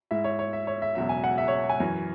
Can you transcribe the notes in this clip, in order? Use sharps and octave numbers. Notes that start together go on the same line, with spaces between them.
G#2 G#3 E4 E5
C#5
C#5
E5
C#5
E5
E1 E2 C#3 F#3 E5
G#5
F#5
E5
C#5
G#5
F#2 E3 C#4